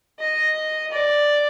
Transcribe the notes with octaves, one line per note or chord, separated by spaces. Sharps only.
D#5
D5